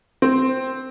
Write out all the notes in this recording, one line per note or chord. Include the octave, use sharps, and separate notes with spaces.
C4